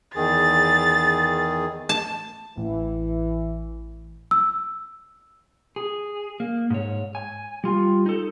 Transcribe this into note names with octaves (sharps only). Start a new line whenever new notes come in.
E2 D#3 G#4 A6
A5
A1 E3
E6
G#4
A#3
G#2 C#5
G#5
G3 F4
D#4 A4